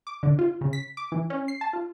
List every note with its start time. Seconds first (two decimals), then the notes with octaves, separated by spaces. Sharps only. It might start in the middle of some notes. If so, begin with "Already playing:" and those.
0.07 D6
0.23 D3
0.39 F4
0.61 C#3
0.73 B6
0.97 D6
1.12 E3
1.30 C#4
1.48 C7
1.61 A5
1.73 F4